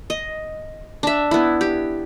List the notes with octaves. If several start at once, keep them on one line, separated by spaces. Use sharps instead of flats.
D#5
D4 E5
B3 E4
G4